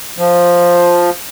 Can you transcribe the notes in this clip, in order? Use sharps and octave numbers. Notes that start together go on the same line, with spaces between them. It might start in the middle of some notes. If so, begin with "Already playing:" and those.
F3